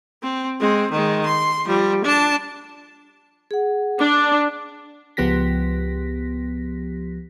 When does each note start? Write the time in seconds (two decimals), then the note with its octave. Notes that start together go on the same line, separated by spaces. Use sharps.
0.23 C4
0.60 G#3 C4
0.91 D#3 G#3
1.25 C6
1.66 F3 G3
2.04 D4 A5
3.51 G#4 F#5
3.99 D4 D6
5.17 C#2 F3 B3 G4 A#6 B6